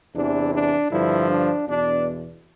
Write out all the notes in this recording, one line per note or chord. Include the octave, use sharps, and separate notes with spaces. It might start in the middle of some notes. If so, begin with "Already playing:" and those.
E2 C3 E3 D4
D4
G2 D3 F3 E4
D4
E2 B2 D4